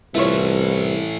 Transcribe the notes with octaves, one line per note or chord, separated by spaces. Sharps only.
C2 E3 A3 E4 F4 B4 C#5